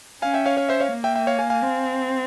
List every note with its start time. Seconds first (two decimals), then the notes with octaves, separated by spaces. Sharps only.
0.22 C#4 F5 G#5
0.34 E5 G5
0.46 C#5 F5
0.57 C#5 F5
0.69 C5 E5
0.80 C#5 F5
0.92 A#3
1.04 E5 G5
1.16 E5 G5
1.27 C#5 F5
1.39 F5 G#5
1.50 F5 G#5
1.62 C4